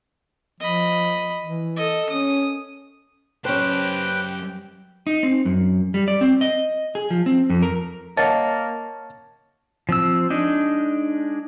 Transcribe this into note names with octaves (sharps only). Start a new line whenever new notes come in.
F3 D#5 B5
E3
A4 D#5
C#4 D#6
F#2 C#4 G4 B4 C5 G5 A5 F#6
D#4
C4
F#2
G3
D5
C4
D#5
G#4
F3
C4
F2
A#4
A#3 C#5 D#5 F#5 A5 A6
F3 C4 E6
G#3 D4 D#4